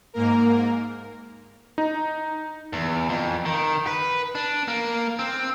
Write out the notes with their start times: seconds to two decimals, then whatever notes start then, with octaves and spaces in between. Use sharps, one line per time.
0.14 G#2 A#3 A#4
1.78 D#4
2.73 E2
3.09 F2
3.45 D#3
3.87 B4
4.35 D4
4.68 A#3
5.19 C4